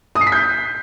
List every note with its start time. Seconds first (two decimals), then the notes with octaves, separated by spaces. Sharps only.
0.15 D#6
0.21 C7
0.27 B6
0.32 G6